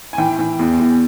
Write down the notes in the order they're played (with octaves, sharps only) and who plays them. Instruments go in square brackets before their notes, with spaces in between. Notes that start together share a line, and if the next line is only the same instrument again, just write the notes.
[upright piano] G#5
E3 G5
E3
E2
E2